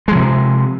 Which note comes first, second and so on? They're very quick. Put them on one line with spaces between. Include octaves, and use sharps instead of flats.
G#3 F3 C3